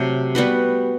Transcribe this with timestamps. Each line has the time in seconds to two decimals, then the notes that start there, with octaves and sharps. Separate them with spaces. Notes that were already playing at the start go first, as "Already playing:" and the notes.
Already playing: C3 F#3 A3
0.35 G3 B3 F#4 B4